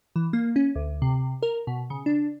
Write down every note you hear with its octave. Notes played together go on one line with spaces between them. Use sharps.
E3
A#3
C#4
D2
C3
A#4
B2
C#3
D4